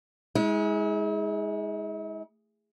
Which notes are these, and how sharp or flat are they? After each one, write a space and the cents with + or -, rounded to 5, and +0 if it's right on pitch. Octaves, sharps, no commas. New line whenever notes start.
G#3 +0 E4 -45